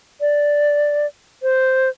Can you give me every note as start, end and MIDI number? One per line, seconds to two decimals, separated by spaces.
0.21 1.06 74
1.43 1.89 72